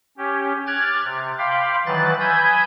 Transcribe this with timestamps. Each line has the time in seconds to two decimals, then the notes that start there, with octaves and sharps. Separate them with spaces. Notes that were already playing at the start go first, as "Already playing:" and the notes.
0.18 C#4 G4
0.67 D6 F6 F#6 G#6 A6
1.03 C3
1.39 F5 G5 B5 C6 D6
1.86 D#3 E3 F#3 B4 F#6 A6
2.20 G#5 B5 D#6 E6 G6 G#6